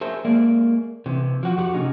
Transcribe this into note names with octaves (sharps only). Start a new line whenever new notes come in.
G#4 A#4 C5 E5 A5
G#3 A#3 A#4 D5 E5
C3 E3
F3 F#4
F2 F#4 G4 F#5
C3 C#4 D#4 G#4